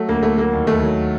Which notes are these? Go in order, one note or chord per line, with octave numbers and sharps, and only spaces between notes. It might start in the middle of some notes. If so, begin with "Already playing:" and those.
Already playing: F#3 A3
D2 A#3
D2 A3
F#3 A#3
D#2
D#2 A3
F#3